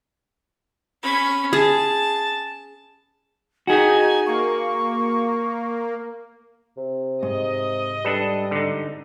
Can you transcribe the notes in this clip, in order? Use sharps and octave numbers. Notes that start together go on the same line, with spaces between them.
C#4 B5
G#4 A5
D#4 F#4 G#4 G#5
A#3 C#6
C3
G#2 D#5
G3 D4 A4 B4
D3 D#4